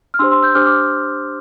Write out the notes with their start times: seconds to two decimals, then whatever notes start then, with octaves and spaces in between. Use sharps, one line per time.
0.14 F6
0.19 D4 G4 C5 C6 E6
0.31 C6 E6
0.42 E6 G6
0.55 D4 G4 C5 D6 F6
0.66 D6 F6